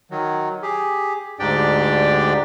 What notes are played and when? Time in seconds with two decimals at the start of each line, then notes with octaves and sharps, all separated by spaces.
0.11 D#3 F#3
0.63 G4 G#4
1.39 D2 G#2 D4 G4 D5 G5